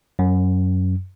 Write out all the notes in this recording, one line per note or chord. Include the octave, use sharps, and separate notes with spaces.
F#2